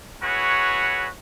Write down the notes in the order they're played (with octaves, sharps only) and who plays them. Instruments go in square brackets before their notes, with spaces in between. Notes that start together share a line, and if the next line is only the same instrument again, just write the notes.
[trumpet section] E4 F#4 G#4 B4 C#5